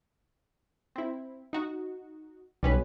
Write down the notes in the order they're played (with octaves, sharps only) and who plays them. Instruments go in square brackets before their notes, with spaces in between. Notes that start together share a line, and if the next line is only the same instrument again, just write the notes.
[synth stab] C4 E4
D#4 F#4
[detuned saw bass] B1 [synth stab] G3 C#4 B4